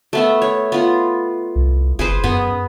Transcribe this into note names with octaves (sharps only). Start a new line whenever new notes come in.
A3 B3 E5
C#5
B3 F4
C2
F#1 G#4 B4 C5
F#2 B3